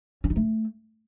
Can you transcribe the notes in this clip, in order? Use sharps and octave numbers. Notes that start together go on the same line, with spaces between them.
C#4
D#4
A3